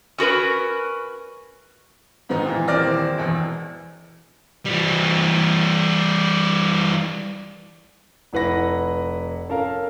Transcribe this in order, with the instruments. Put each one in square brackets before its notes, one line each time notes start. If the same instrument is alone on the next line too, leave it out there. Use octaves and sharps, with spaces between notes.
[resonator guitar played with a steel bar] C#4 F#4 A#4 B4
[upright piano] G#2 D#3 B3 D#4
A#2 E3
D#1 E3 C4 D5 F6 A#6
E1 E2
[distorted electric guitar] E3 G3
[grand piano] F1 E4 B4 F#5 A#6
C#4 A4 A#4 F5